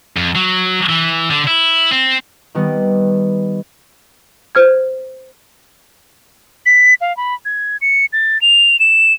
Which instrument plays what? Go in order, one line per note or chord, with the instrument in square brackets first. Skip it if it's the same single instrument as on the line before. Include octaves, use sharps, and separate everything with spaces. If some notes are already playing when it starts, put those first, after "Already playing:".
[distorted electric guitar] F2
F#3
E3
D3
E4
C4
[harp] D#3 G3 B3
[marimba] B4 C5 F6 G#6
[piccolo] B6
F5
B5
G#6
C#7
A6
F7
E7